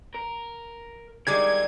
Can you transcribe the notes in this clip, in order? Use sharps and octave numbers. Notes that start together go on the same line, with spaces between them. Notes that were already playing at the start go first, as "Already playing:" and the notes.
A#4
D#3 G3 G#3 A#4 D5 G#6